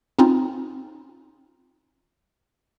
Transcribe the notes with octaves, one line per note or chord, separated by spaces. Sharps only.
C4 C#4 D#4 F4